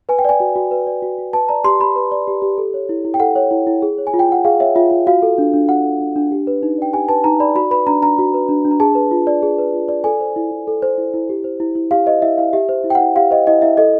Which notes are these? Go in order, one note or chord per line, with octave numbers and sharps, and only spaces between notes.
B4 G#5
G5
D5 G#5
F#4
F#4
B4
D5
F#4
F#4
B4 A5
D5 A#5
G4 C6
G4 B5
B4
D5
G4
G4
A4
C#5
E4
E4
G5
A4 F#5
C#5
E4
E4
G#4
C#5
G#5
F4
G5
F4 F#5
G#4 F5
C#5 E5
F4 E5
F4
F#4 F5
A4
D4
D4
F#4 F#5
A4
D4
D4
G4
B4
D#4
D5 G5
G4 G#5
B4 A5
D#4 A#5
D5 B5
F#4 B5
B4 B5
D4 A#5
D4 A#5
F#4
B4
D4
D4
A#5
G#4 A5
B4
F4
D5
G#4
B4
F4
D5
A4 G#5
C5
E4
E4
A4
C5
E4
E4
G4
C5
E4
E4
G4 F5
C5 D#5
E4 E5
E4 F5
G4 E5
C5
E4
G5
F#5
E4
G4 F5
C5 D#5
E4 D#5
E4 E5
A4 D#5